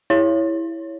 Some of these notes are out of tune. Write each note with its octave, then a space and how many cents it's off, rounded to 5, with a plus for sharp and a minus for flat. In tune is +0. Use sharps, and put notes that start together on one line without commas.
E4 +0 C#5 +0